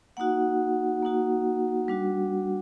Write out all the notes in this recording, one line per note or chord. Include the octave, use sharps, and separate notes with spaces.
A#3 D#4 F#4 F#5
A#3 D#4 F#4
G3 D4 F#4